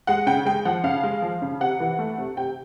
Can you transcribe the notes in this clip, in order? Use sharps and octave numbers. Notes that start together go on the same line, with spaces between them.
G#3 F#5
C#3 G5
G#3 G5
F3 F#5
C#3 F5
G#3
F3
C#3
C3 F#5
E3
A3
C3
C3 G5